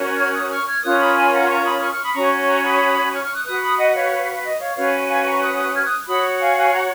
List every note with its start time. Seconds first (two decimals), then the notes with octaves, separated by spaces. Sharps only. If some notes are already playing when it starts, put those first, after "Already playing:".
Already playing: C#4 F#4 A#4 C#5
0.18 F6 G#6
0.34 D#6 F#6
0.50 C#6 F6
0.67 F6 G#6
0.83 C#4 F4 A#4 C#5 D#6 F#6
1.00 B5 D#6
1.16 G#5 B5
1.32 F#5 A#5
1.49 A#5 C#6
1.65 B5 D#6
1.82 C#6 F6
1.92 C#6 F6
2.03 B5 D#6
2.14 C#4 F#4 C#5 A#5 C#6
2.47 A#5 C#6
2.63 B5 D#6
3.13 C#6 F6
3.23 C#6 F6
3.34 D#6 F#6
3.45 F#4 B4 D#6 F#6
3.61 B5 D#6
3.78 D#5 F#5
3.94 C#5 F5
4.43 D#5
4.60 C#5 F5
4.76 C#4 F#4 B4 C#5 F5
5.09 F5 G#5
5.26 A#5 C#6
5.42 D#6 F#6
5.58 D#6 F#6
5.74 F6 G#6
5.85 D#6 F#6
6.07 F#4 C#5 B5 D#6
6.39 F5 G#5
6.56 F5 G#5
6.73 F#5 A#5